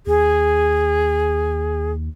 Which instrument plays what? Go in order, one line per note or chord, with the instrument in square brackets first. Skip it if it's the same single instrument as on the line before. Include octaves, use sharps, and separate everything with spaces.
[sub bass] D#2 [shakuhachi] G#4